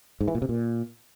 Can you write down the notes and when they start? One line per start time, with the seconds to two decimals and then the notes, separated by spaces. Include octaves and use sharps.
0.21 G#2
0.28 E3
0.35 A#2
0.42 C3
0.49 A#2